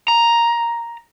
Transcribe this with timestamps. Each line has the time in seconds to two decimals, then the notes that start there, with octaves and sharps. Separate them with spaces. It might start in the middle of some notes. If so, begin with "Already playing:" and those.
0.08 A#5